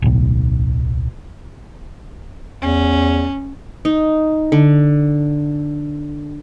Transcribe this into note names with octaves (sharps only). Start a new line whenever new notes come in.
D1 B1
E2 C#4
D#4
D3